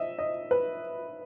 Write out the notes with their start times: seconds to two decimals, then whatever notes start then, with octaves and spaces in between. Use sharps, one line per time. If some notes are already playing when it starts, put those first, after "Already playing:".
Already playing: D#5 E5
0.19 D#5
0.51 B4